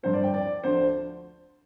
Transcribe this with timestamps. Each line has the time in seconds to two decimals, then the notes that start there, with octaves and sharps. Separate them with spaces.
0.03 G2 D3 F3 C5
0.13 D5
0.24 G5
0.34 D5
0.64 D2 D3 F3 C5